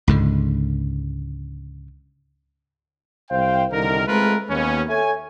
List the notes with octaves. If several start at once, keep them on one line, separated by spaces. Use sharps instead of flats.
C#2 G#2 D3
C2 C5 F5 G5
C2 D3 D#3 A#4
G#3 A3 C4 F4 A#4 B4
D#2 B3 C#4
A4 C#5 E5 G#5